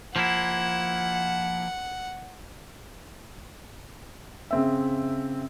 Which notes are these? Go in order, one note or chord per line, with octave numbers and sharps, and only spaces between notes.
F3 A#3 E4 F#5
C#3 C4 E5